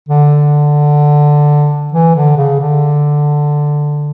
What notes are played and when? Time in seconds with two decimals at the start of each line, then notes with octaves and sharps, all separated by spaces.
0.09 D3
1.92 E3
2.15 D3
2.37 C#3
2.60 D3